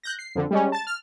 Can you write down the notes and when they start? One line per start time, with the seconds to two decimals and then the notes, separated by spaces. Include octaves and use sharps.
0.03 F#6 G6 A#6
0.19 C7
0.35 F2 D3
0.51 G3 G#3 C#4
0.72 A5 A6
0.87 F6